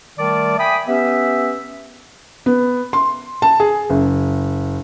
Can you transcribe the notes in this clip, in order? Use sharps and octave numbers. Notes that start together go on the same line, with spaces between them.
D#3 G3 A3 D5 A5 D6
E5 G5 G#5 B5 D#6
B3 C#4 G4 B4 E5
B3
C6
A5
G#4
F#1